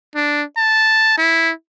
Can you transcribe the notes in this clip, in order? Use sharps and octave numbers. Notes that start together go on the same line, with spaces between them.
D4
A5
E4